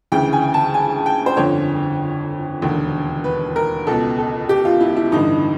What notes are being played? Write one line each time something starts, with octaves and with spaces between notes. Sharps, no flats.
D2 C#3 E3 G5
G#5
A5
G#5
G5
C5
G1 F2 D3 C#5
E1 D#2 D3
B4
A#4
C#2 B2 A4
A4
G4
F4
E4
E4
A1 G2 D3 D#4